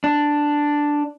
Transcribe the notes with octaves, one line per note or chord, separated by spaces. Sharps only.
D4